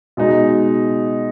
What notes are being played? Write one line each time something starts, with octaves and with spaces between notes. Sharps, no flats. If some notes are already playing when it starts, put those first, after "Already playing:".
B2 G#3 D#4